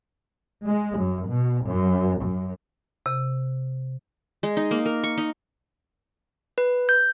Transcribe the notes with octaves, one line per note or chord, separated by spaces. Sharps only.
G#3
F#2
B2
F#2
F#2
C3
G#3
D#4
A#3
A#4
C#6
D#4
B4
G6